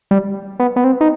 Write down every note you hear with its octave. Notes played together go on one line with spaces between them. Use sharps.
G3
B3
B3
C4
D#4